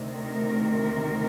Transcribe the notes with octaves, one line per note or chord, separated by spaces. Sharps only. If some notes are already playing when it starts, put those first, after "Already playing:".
Already playing: D2 C3 D#3
A#4